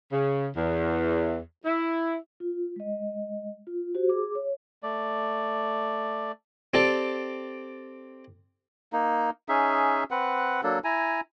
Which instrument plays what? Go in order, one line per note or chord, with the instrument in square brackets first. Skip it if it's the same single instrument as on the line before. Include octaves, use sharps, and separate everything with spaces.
[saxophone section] C#3
E2
E4
[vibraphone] F4
G#3 D#5
F4
F#4 G4 C5
G#4 D6
C#5
[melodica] A3 D5
[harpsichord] C4 G4 A4 D5
[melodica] A#3 D#4
C#4 D#4 G#4 E5
C4 B4 F#5
F#3 A#3 D4 A4
E4 G#5 A#5